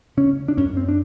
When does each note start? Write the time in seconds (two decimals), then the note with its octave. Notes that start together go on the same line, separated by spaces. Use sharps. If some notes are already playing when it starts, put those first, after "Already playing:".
0.17 C#3 C#4
0.48 D4
0.57 F#2 C#4
0.77 C4
0.89 D4